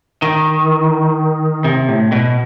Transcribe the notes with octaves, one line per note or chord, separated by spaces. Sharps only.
D#3
C3
A2
B2